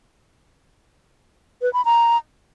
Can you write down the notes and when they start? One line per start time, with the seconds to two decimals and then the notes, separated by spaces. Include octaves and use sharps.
1.62 B4
1.73 B5
1.85 A#5